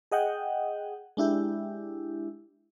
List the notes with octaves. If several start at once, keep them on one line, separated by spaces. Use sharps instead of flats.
G#4 D#5 F#5 G5
G#3 D4 E4 G4